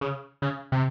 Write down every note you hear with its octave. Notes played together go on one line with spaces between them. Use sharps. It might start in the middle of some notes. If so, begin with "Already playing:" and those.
C#3
C#3
C3